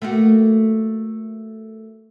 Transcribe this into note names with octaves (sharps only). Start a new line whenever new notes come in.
A3 A#3 F#4